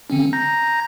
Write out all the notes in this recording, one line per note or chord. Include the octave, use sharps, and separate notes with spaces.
D3 C4 C#4
A#5 G6 A#6